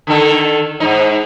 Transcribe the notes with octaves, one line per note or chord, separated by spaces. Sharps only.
D3 D#3 A4
G#2 D#4